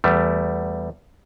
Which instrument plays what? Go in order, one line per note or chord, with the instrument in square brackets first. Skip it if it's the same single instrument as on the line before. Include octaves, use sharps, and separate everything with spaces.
[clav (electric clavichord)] E2 G3 A3